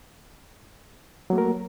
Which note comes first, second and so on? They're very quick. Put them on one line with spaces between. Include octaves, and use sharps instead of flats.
F#3 A#3 A3 A#4